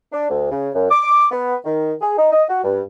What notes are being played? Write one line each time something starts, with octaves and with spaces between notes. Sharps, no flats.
D4
D2
C#3
F#2
D6
B3
D#3
G#4
D#4
D#5
F#4
G2